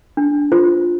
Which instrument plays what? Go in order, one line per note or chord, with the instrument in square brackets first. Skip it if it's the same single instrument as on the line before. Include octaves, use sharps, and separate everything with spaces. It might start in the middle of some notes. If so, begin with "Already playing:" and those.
[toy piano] D4
F4 C5